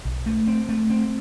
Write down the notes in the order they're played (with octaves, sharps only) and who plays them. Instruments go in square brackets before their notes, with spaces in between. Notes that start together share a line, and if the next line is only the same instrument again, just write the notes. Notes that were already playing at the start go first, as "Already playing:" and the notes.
[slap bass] B1
A3
C4
A3
C4